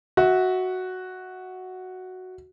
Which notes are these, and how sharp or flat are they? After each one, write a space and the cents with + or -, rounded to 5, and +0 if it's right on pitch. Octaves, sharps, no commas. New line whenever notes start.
F#4 +0 E5 -25